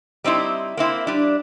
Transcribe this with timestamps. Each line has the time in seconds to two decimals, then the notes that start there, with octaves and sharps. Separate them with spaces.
0.24 G3 C4 D#4 E4
0.77 A#3 C4 E4
1.07 G3 D4